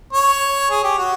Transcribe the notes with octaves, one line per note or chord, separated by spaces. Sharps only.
C#5
G#4
G4
F#4